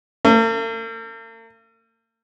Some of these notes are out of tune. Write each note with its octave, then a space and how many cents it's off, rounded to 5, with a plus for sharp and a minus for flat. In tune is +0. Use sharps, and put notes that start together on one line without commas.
A#3 -45